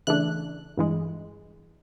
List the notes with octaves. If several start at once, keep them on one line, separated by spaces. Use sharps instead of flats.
C#3 E3 A3 D4 F#6
G2 E3 G#3